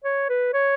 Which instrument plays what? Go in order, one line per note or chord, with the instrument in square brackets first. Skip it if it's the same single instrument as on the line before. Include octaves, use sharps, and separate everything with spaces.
[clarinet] C#5
B4
C#5